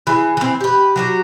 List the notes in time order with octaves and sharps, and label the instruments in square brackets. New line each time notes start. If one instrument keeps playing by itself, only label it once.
[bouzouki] E3 G#4
E3 C4
G4 B4
F#3 F#4 G4